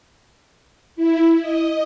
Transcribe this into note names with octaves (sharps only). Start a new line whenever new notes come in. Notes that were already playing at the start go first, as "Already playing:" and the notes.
E4
D#5